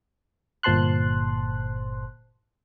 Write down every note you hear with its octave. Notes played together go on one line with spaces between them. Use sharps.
G1 A#2 C5 A5 C6 F#6